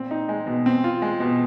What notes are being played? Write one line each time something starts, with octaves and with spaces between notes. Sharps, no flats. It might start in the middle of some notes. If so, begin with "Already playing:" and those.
Already playing: A#2 C4
D#4
G#3
B2
C4
F4
G#3
B2